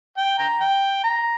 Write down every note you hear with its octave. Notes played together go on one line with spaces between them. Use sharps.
G5
G5 A#5
G5
A#5